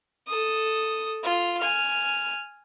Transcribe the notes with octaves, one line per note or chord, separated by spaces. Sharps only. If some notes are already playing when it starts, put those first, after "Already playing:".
A4 D#6
F4
G#5 F6